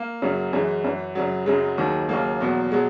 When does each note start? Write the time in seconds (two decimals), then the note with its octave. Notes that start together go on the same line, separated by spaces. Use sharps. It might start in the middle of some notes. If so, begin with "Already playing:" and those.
Already playing: A#3
0.22 F#2 C#3 F#3
0.53 F#2 E3 G#3
0.84 F#2 E3
1.15 F#2 C#3 F#3
1.46 F#2 C#3 F#3 G#3
1.78 D#2 D#3 F#3
2.09 D#2 C#3 F#3 A#3
2.40 E2 B2 F#3
2.72 B2 F#3 G#3